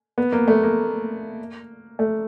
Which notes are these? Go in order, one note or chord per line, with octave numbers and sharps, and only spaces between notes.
B3
A#3
A3
A#3
A3